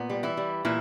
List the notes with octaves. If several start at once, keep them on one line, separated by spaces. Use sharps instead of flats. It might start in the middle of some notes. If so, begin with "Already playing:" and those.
Already playing: A#2 B3
G3
E3 E4
G3
A#2 E3 E4